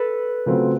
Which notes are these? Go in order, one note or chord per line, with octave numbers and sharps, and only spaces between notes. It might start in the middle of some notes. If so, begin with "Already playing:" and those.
Already playing: A4 B4
C#3 F#3 A3 C4 F4